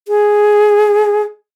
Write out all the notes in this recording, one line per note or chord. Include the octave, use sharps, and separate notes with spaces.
G#4